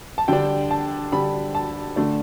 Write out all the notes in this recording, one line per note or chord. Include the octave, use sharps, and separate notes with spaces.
A5
D3 G3 D4 G5
A5
D3 G3 D4 B5
A5
D3 A3 D4